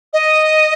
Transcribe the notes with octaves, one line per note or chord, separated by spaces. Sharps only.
D#5